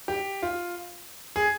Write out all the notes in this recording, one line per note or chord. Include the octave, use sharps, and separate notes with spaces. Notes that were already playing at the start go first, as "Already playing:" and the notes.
G4
F4
G#4